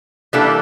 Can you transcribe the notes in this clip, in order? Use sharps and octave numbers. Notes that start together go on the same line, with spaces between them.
E3 G3 A#3 D4 A4